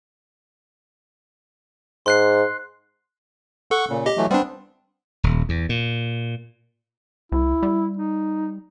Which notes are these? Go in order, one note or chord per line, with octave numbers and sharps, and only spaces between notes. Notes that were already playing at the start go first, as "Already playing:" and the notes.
G#2 C6 F#6 C7
A4 F#5 C#6
A#2 C#3
G4 D#5
E3 F#3 A3
G3 B3 C4 D4
D#1
E2
A#2
C2 E4
G3
D#4